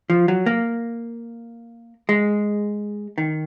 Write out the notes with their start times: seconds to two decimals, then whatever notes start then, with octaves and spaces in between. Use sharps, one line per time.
0.10 F3
0.28 F#3
0.46 A#3
2.09 G#3
3.18 D#3